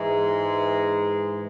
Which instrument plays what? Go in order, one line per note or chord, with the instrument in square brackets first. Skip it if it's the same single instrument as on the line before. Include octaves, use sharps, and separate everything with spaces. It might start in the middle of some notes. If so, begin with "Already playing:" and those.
Already playing: [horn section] G#2 E3 G#3